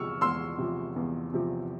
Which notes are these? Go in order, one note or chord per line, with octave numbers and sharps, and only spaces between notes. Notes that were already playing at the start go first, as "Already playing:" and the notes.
Already playing: E2 C3 F3 C#6 E6 F6
E2 C6 E6
C3 F3
E2
C3 F3